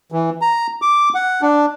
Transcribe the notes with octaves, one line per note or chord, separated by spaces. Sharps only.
E3
A#5
D6
F#5
D4